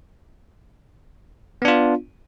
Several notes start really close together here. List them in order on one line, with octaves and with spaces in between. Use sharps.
B3 D4 F4